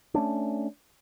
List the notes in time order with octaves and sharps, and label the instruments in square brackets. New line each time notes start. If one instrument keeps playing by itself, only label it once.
[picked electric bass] A3 C#4 D4